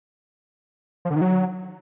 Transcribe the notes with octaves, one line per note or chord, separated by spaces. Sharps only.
F3
D3
D#3
F#3